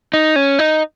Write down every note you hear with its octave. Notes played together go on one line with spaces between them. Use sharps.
D#4
C#4
D#4